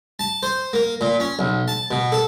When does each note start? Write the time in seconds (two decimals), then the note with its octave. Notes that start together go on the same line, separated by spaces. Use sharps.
0.19 A5
0.43 C5
0.73 A#3
1.01 A#2
1.20 C#4
1.39 B1
1.68 A5
1.91 B2
2.12 A4